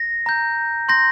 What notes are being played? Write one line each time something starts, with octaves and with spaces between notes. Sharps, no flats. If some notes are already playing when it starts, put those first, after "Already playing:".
Already playing: A#6
A#5 G6
C6 G6 A#6